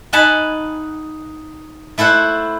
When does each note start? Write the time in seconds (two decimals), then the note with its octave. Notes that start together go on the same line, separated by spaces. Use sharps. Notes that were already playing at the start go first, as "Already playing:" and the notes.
0.13 D#4 F#5 G#5 A5 B5
1.98 A3 E4 A4 C5 F#5